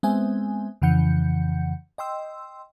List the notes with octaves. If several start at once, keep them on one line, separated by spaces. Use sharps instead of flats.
G#3 B3 C4 C5 E5 G#5
F2 C#3 E3 F#5 G6 C#7
D#5 G5 C6 E6